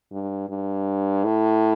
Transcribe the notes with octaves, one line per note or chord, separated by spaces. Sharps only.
G2
G2
A2